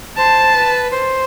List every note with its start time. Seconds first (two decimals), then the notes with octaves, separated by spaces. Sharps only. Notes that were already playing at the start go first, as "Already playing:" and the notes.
0.17 C5 A5
0.54 B4
0.91 C5